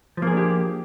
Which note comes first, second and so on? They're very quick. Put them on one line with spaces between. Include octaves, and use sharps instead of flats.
F3 A#3 G#4 D4 G4